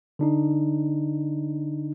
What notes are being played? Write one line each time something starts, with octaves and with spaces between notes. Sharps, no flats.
D3 D4 D#4